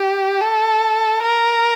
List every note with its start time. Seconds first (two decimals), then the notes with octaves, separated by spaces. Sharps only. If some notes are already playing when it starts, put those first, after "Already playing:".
Already playing: G4
0.41 A4
1.22 A#4